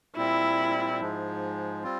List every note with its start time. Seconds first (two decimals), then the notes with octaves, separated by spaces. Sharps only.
0.16 A#2 G3 C4 E4
1.01 G#2 F3 G#3
1.83 G3 C4 F4